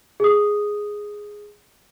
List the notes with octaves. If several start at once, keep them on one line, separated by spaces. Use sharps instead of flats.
G#4 D#6